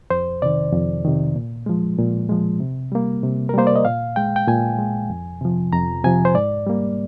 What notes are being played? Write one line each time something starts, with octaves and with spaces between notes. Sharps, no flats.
F2 C5
C3 D#3 D5
F2
C3 D#3
A#2
F3 G#3
A#2
F3 G#3
C3
G3 A#3
C3
A#4
G3 A#3 C5
D5
D#5
A#2 F5
G#3 G5
G5
A#2 G#5
G#3
F2
C3 F3
F2 A#5
C3 F3 G#5
C5
G#2 D5
G3 A#3